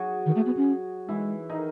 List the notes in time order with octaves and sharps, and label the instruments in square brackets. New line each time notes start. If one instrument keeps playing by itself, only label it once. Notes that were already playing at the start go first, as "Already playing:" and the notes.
Already playing: [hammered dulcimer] F#3 F#4 G#4
[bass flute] D#3
A3
B3
C#4
[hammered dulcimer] E3 E4 [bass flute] G#3
[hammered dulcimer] D#3 D#4